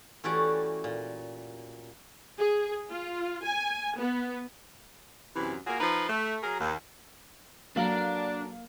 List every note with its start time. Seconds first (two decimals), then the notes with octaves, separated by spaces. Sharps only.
0.24 E3 A3 C#4 F#4 G4 D5
0.84 A#2
2.38 G#4
2.90 F4
3.43 G#5
3.98 B3
5.36 F#2 C3 E3
5.67 A#3 F4 F#4 G#4
5.80 F3 D#4 A#4 B4
6.09 A3
6.43 F#3 G#4 A#4
6.61 D#2
7.76 F#3 A#3 D4 A4 A#4 F5 F#7